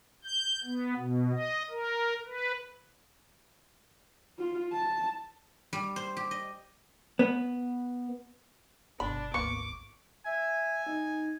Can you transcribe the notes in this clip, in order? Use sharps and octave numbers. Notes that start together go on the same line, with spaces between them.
G6
B3
B2
D#5
A#4
B4
F4
A5
G3
C5
G4
D#5
B3
G1 B2 D4 B5
G#1 D2 A#3 B4 C#6 D6
E5 G#5
D#4